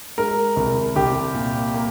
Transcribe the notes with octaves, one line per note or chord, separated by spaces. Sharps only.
G#3 A#4
C2
C2 G4
A#2
A#3